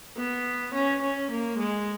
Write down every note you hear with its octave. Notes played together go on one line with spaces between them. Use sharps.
B3
C#4
C#4
A#3
G#3